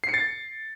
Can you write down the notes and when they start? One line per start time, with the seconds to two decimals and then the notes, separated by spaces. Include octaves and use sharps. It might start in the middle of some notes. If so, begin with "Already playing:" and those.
0.04 C7
0.09 C#7
0.14 A6